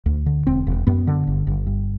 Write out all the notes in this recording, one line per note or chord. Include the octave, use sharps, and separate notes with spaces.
D2
D3
E1 C4
E1
F#2 B3
D3
G1
G1
G2